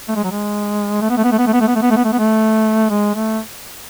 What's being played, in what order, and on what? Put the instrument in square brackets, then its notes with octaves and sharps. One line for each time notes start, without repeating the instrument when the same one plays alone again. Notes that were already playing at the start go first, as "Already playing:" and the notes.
[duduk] A3
G#3
F#3
G#3
A3
B3
A3
B3
A3
B3
A3
B3
A3
B3
A3
B3
A3
B3
A3
B3
A3
G#3
A3